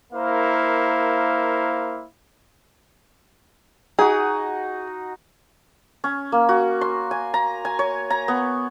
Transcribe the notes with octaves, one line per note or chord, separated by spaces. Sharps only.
A#3 E4 A#4 C5 F5
D#4 F#4 G#4
C#4
A#3
F#4
C6
G#5
A#5
G#5
C#5
A#5
B3